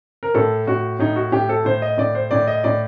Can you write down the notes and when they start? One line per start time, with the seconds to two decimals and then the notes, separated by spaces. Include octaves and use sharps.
0.23 A#4
0.34 A2 A4
0.67 A2 F#4
0.99 A2 D#4
1.16 F#4
1.32 A2 G4
1.49 A4
1.65 A2 C5
1.82 D#5
1.98 A2 D5
2.15 C5
2.31 A2 D5
2.47 D#5
2.64 A2 D5